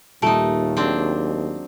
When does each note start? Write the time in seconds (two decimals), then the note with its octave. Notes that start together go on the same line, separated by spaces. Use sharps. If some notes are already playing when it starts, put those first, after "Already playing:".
0.22 D#2 A#2 G3 A3 D#4 G4 A5 D7
0.77 F#3 C4 D4 G#4 D#5